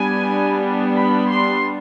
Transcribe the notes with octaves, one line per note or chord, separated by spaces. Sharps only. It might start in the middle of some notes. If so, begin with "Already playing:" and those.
Already playing: G3 B3 D4 G#5
B5
C6